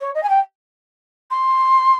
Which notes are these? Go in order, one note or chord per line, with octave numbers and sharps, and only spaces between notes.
C#5
D#5
G#5
G5
C6